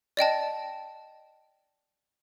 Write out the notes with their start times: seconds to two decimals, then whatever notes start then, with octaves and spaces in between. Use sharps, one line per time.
0.17 D5 D#5 G5 A5